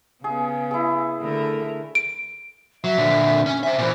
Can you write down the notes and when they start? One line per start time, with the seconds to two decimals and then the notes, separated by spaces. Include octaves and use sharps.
0.24 C#3 B3 G#4
0.71 E4 G#4
1.21 D3 A3 A#4
1.95 D7
2.84 F#3 E5
2.98 A#2 D3
3.46 C#4 G#5
3.63 C5 E5 G#5
3.78 A#2 E3 C5